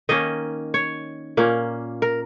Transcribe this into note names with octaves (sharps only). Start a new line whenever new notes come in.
D#3 A#3 C#4 D#5
C#5
A#2 A#3 C#4
A#4